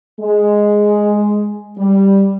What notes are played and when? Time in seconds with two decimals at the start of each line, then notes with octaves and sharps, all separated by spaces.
0.20 G#3
1.77 G3